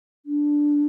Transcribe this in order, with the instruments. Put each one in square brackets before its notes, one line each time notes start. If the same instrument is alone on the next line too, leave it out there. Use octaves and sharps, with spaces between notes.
[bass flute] D4